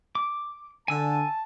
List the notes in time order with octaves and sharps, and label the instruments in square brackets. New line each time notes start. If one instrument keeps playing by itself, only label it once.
[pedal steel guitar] D6
[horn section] D3 [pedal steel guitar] G#5 E6 [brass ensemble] A5